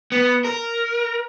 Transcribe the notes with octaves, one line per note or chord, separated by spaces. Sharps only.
B3
A#4